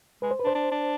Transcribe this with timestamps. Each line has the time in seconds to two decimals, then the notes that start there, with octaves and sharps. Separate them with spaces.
0.22 G#3 B4
0.31 C5
0.40 B4
0.44 D4
0.47 C5
0.55 D4
0.72 D4